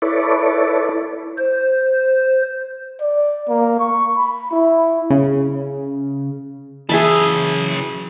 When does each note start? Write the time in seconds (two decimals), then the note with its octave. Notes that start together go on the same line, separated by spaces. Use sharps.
0.02 E4 A4 B4 C#5 D5
1.38 C5
3.01 D5
3.49 A#3
3.80 C#6
4.17 B5
4.51 E4
5.10 C#3
6.89 C#3 E3 F#3 G#4 E5 A5